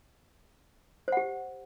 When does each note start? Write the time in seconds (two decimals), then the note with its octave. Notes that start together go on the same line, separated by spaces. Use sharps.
1.08 C5
1.12 F#5
1.17 G4